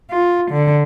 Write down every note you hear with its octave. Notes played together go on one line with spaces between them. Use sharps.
F4
D3